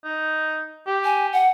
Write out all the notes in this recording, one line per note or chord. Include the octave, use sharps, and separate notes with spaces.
D#4
G4
G#5
F#5